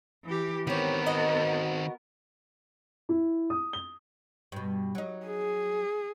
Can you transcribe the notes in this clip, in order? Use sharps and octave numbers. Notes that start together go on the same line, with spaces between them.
E3 G4
D#3 B3 C4 G4 A#4 C#5
F#4 D#5
E4
D#6
G7
G2 B2
F#3 D#4
G#4